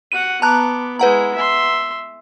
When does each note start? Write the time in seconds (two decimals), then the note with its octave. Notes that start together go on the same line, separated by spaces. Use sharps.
0.12 F#4 F#5 D#7
0.42 B3 A5 A#5 D6 F#6
0.99 G#3 E4 B4 F#5 A#5
1.35 E5 C6